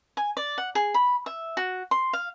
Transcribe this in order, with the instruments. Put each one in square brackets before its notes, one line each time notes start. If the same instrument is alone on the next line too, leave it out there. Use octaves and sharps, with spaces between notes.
[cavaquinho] G#5
D5
F#5
G#4
B5
E5
F#4
C6
F5